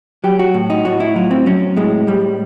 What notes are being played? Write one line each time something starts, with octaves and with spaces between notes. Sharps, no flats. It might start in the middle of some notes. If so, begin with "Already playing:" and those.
F#3 G4
F#4
A2
D#4
A2 F#4
E4
F#3 F4
C4
F#3 C#4
A2 G#3
A2 G3